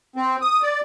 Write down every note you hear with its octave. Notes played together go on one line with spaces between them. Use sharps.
C4
D#6
D5